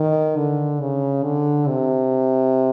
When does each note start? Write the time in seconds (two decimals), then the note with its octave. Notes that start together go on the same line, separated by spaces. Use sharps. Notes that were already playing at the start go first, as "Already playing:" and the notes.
Already playing: D#3
0.36 D3
0.81 C#3
1.24 D3
1.68 C3